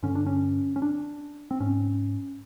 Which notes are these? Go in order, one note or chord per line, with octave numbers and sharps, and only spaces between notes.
G2 D3 C#4
D4
C#4
C#4
D4
C4
G#2 C#4